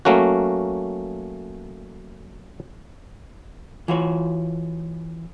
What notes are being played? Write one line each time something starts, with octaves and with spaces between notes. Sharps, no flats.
F#3 A3 A#3 C#4 F#4
E3 F4 F#4 C#5